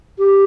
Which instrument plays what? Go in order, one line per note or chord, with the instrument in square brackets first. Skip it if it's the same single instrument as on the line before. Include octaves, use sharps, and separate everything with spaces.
[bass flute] G4